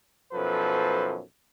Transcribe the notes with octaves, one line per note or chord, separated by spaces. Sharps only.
B1 F#2 F3 A4 B4 C5